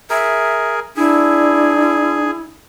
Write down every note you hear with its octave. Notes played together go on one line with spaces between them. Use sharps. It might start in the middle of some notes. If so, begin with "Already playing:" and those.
G#4 A#4 E5
D4 E4 G#4